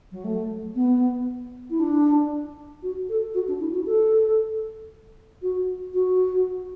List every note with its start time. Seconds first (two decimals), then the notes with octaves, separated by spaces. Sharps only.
0.12 F#3
0.24 A3
0.75 B3
1.70 E4
1.80 D4
2.82 F#4
3.09 A4
3.34 F#4
3.48 D4
3.60 E4
3.74 F#4
3.86 A4
5.42 F#4
5.94 F#4